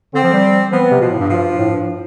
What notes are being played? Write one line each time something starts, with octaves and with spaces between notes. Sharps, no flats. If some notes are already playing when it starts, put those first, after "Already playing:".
D3 C4
F3
G3
F3 B3
C3
B2 F3
A2
G2
F3
A2
G2